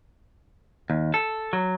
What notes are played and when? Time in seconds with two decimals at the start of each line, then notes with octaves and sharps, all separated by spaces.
0.90 D#2
1.14 A4
1.53 F#3